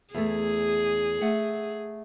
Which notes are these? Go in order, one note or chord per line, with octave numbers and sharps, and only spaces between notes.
E2 A3 G#4
A3 F#5